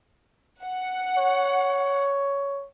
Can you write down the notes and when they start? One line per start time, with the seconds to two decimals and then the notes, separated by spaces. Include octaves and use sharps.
0.63 F#5
1.18 C#5